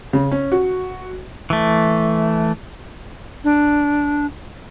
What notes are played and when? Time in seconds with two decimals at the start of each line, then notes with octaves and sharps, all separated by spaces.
0.13 C#3
0.31 C#4
0.52 F#4
1.50 E3 A3
3.44 D4